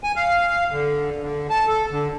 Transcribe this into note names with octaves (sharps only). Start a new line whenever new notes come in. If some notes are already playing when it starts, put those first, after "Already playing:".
G#5
F5
D3
D3
A5
A4
D3